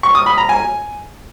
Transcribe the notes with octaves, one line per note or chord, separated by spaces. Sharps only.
C#6
D#6
B5
A#5
G#5